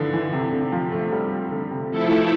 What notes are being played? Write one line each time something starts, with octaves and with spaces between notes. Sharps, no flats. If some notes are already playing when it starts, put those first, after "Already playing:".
Already playing: D3 E3 F3
E3
C3
D3
F3
A3
G3
A3
D3
C3
F3 A3 E4 A4
E3